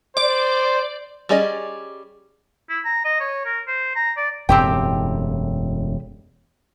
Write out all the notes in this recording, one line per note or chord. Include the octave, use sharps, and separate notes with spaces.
C5 D5
G3 C#4 G#4 D5 D#5
E4
A#5
D#5
C#5
A#4
C5
A#5
D5
E1 F#2 A2 C4 G4 G5